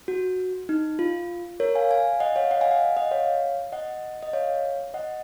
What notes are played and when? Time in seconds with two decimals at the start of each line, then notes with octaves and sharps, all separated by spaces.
0.08 F#4
0.69 D#4
0.99 F4
1.60 A#4 C#5
1.75 F5 G#5
1.90 F5 G#5
2.20 D#5 F#5
2.36 C#5 F5
2.51 D#5 F#5
2.61 F5 G#5
2.71 D#5 F#5
2.97 D#5 F#5
3.11 C#5 F5
3.72 D#5 F#5
4.23 D#5
4.33 C#5 F5
4.94 D#5 F#5